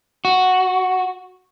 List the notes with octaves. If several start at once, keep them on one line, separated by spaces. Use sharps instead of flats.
F#4